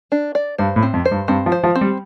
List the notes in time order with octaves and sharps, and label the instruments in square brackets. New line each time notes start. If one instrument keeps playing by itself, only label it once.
[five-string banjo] D4
D5
[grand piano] G2 [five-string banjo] C5
[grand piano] A2
[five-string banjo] C4
[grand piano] F2
[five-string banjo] C5
[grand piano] G2
[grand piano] G2 [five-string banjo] C4
[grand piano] F3
[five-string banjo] C5
[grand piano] F3
[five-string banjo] C4
[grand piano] G3